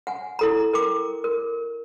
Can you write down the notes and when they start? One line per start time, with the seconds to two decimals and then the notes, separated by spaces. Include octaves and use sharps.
0.07 F#5 G#5
0.39 E4 A4 A#5
0.73 A#4 G5 D6
1.24 A#4